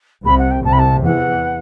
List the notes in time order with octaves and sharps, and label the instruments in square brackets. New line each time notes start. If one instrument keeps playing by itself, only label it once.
[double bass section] C2 C3 [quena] B5
[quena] F#5
G5
[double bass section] C2 C3 [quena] A5
[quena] B5
A5
[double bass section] E2 E3 [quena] F#5